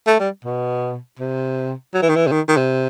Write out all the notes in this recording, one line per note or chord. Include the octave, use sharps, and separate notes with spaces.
A3
G3
B2
C3
F#3
E3
D#3
E3
C3
D#3
D#3
C3